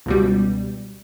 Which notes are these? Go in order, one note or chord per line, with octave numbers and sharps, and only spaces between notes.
C#2 B2 G3